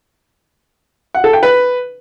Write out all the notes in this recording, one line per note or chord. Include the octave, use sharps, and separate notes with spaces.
F#5
A4
G5
B4